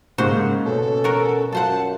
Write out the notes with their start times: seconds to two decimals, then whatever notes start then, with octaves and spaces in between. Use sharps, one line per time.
0.18 G#2 C#3 A#3 F#4 C5
0.65 B2 C#4 A4
1.04 F#4 A#4
1.52 F#2 F4 A4 C5 F#5 A5